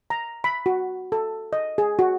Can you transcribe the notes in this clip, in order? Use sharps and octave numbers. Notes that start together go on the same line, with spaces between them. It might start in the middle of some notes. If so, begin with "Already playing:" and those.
A#5
B5
F#4
A4
D#5
G#4
F#4